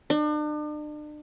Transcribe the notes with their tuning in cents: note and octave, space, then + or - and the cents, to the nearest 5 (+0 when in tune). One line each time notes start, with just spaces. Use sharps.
D4 +40